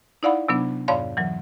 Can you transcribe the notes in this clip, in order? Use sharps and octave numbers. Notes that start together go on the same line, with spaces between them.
D#4 E4 D5 F5 F#5 B5
C3 F#3 B3 D4
F2 G#2 C#5 D5 F5 B5
E3 F#3